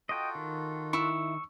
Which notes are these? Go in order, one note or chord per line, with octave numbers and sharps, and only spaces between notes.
F4 F#4 A4 D#5 G5
D#3
E4 C#6 E6